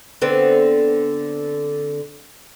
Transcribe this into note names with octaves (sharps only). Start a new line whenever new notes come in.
D3 B3 C4